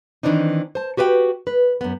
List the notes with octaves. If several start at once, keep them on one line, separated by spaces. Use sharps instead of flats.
D#3 E3 C4 D4 D#4
C5 A5
F#4 G4 B4 D#5 G5
B4
F#2 B3